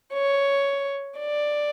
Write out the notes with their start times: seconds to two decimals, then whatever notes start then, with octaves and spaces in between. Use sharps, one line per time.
0.13 C#5
1.19 D5